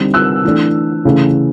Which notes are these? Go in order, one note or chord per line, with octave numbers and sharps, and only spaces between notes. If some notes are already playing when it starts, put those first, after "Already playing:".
Already playing: D3 G3 C4 D#4
E6 F#6
E3 A3 D4
C#3 E3 A3 C#4